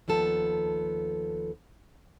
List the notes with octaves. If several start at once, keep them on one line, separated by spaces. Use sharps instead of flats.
D#2 F3 B3 A4